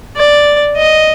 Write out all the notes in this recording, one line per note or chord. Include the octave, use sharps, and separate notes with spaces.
D5
D#5